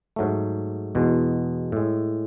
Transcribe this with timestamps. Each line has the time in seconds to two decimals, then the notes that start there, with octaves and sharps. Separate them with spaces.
0.16 G#2 F#3 A3
0.95 E2 B2 G#3
1.72 A2 G#3